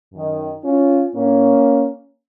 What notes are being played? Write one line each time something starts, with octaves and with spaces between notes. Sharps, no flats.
F#2 D#3
C#4 F4
A2 A#3 C#4